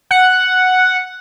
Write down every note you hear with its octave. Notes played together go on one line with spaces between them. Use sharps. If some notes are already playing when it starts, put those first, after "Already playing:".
F#5